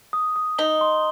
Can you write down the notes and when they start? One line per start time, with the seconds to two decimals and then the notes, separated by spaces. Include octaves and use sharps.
0.13 D#6
0.36 D#6
0.58 D#4 G7
0.81 C6